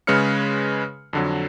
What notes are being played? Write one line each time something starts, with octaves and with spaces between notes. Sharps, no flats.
C#3 G#3 B4 C#5 F6 C#7
F2 D3 F#3